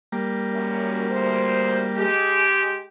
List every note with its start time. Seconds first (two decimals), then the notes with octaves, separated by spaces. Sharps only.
0.12 G3 A#3
0.52 F#2
1.10 D2 C5
1.96 G#3 G4